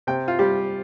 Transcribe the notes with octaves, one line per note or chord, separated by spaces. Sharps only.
C3 G5
F4
G3 G4